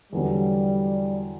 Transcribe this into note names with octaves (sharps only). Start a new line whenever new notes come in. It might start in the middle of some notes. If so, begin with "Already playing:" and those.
E2 D3 F#3 G3